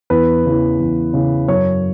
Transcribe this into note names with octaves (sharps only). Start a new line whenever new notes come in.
E2 B4
C#3 E3
E2
C#3 E3
F#2 C#5